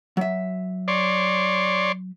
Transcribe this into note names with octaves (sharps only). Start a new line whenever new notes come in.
F#3 E5
C#5 D5 C6